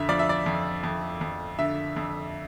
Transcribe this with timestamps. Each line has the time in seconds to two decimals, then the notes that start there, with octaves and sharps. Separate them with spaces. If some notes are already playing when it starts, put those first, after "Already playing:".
Already playing: F2 D3 E5
0.09 F3 D5
0.19 E5
0.29 D5
0.46 F2
0.83 F2
1.21 F2
1.59 D3 E5
1.96 F2